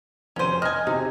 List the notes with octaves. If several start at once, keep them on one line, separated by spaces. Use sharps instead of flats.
F1 C#4 C5 D#7
D#5 G#5 F6
C3 D#4